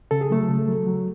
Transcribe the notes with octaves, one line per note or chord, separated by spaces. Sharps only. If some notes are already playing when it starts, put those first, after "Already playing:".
C#3 A4
G#4
F#3 A3 A4
C#3
F#3
F#3